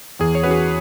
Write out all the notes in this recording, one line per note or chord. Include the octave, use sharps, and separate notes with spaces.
E2 G#4
C#5
E3 C#4 F#4 B4
G#4